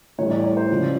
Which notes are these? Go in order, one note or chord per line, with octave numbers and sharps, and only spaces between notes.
A2 E3 G3 C#5
D5
C#5
C5
C#2 C#3 F3